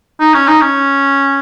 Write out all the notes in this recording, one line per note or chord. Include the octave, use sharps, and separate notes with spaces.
D#4
C#4
D#4
C#4